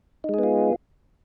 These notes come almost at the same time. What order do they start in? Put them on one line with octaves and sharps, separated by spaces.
D#4 G#3 G#4 B3 F4